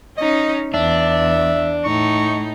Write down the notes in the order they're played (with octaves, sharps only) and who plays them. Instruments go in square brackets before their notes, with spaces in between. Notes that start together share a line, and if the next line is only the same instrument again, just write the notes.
[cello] C#4 D#4 [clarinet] D#5
[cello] E2 [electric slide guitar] D4 [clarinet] E5
[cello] A2 D#4 [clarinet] C#6